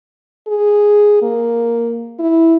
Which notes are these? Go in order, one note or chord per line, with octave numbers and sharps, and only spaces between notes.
G#4
A#3
E4